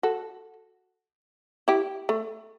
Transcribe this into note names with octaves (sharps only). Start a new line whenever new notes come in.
F#4 A4
E4 G4
A3